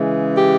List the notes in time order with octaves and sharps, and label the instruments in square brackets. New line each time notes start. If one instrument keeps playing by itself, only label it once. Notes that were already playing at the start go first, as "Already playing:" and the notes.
Already playing: [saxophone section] C#3 E3 G#3
[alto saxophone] G4